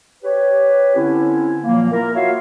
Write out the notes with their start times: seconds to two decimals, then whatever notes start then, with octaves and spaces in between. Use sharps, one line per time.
0.23 G4 B4 C#5
0.95 D3 C4 C#4 E4
1.63 A#2 F3 F#3 A#3
1.91 A#3 E4 F4 A#4
2.14 F4 F#4 C#5 E5 F5